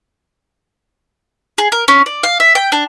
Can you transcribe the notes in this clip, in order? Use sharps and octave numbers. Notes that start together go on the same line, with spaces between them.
G#4
A#4
C#4
D5
F5
E5
G5
D4